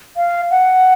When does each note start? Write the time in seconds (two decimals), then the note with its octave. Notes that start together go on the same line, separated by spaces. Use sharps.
0.17 F5
0.51 F#5